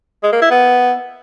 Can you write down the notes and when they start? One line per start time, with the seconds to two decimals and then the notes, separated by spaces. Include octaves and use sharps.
0.23 G#3
0.32 A#3
0.42 E4
0.51 B3